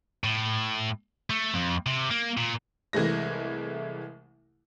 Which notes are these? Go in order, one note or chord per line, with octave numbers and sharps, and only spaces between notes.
A2
A3
F2
C3
A#3
A#2
C2 E3 G#3 A3 A#6